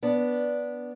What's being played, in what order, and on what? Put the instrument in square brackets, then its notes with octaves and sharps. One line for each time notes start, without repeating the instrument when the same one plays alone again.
[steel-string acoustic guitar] B3 D4